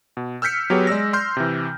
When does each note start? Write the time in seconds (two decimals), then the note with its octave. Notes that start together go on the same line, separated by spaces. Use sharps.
0.17 B2
0.42 E6 F6 G6 B6 C#7
0.70 F#3 B3 G4 G#4 C#5
0.87 G#3 D5 E6 A#6
1.13 C6 F6 G6
1.37 C3 E3